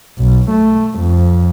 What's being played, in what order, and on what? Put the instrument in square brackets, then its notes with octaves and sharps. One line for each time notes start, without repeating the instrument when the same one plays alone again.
[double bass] B1
A3
F2